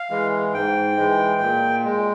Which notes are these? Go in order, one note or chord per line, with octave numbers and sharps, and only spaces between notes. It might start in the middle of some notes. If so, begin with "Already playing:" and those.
Already playing: F5
E3 G#3
G#2 G5
E3 G#3
A#2
G#3